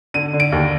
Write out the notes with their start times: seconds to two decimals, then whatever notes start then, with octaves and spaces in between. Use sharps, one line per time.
0.14 D3 D#7
0.33 D3
0.40 D7
0.52 D#2